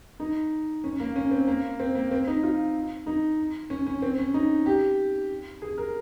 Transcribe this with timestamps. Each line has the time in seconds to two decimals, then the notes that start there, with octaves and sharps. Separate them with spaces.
0.20 D#4
0.84 C#4
1.00 A#3
1.16 C#4
1.31 C4
1.48 A#3
1.80 C4
1.95 A#3
2.11 C4
2.27 D#4
2.43 F4
3.06 D#4
3.70 C#4
3.87 C#4
4.02 C4
4.18 C#4
4.34 D#4
4.66 G4
5.62 G#4
5.78 A#4